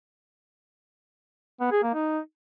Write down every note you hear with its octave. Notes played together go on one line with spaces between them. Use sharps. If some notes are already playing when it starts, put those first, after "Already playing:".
B3
G#4
A#3
D#4